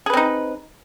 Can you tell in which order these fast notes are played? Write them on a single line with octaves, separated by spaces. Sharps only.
G#4 B4 C4 D#4